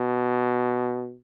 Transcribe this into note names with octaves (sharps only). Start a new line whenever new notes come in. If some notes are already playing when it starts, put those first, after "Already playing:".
Already playing: B2